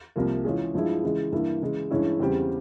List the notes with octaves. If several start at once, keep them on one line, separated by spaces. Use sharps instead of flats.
C2 C3 F3 A#3
E3 G#3 C#4 F4 G#4
G2 F3 G#3 E4
C#3 E3 G#3
G2 E3 A#3 E4
C#3 E3 G#3
G2 E3 G#3 C#4 E4
E2 C#3 G3 C4 G4